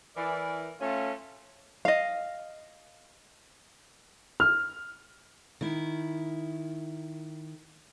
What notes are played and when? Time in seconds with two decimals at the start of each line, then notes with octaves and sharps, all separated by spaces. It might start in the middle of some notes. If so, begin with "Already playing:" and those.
0.17 E3 A#4 D5
0.80 A3 C#4 F4
1.85 D#5 F5
4.40 F6
5.61 D#3 E4